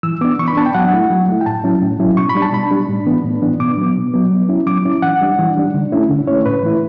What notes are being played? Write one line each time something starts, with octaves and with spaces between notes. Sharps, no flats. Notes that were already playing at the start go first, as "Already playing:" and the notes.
E3 E6
B3 D4 D6
E3 C#6
B5
B3 D4 A5
G5
F#3 F#5
A3 E4
F#3
A3 E4
G5
A2 A5
F#3 C#4 E4
A2
F#3 C#4 E4
B2 C#6
B5
G3 D4
A5
B2 B5
G3 D4
A2
E3 B3 D4
A2
E3 B3 D4
B2 D6
F#3 B3
B2
F#3 B3
F#3
C#4 E4
F#3 D6
C#4 E4
E3 F#5
G3 D4
E3
G3 D4
D3
A3 C#4 E4
D3
A3 C#4 E4 C#5
A2 B4
E3 A3 E4